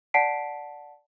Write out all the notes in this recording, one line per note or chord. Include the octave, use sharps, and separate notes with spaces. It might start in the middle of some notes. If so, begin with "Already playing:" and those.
D5 F#5 A5 B6 C7 D7